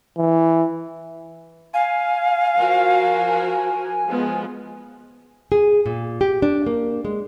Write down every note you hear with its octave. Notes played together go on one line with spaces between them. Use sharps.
E3
F5 G#5
F3 F#4 A#4
F3 G#3 B3
G#4
A#2
G4
D4
A#3
G#3